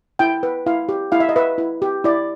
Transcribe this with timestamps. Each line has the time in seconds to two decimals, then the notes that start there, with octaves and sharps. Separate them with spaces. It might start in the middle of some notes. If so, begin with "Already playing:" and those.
0.19 E4 G5
0.43 B4
0.66 E4 F5
0.89 G4
1.12 E4 F5
1.20 E5
1.29 D#5
1.36 B4 E5
1.58 E4
1.82 G4
2.04 E4 D5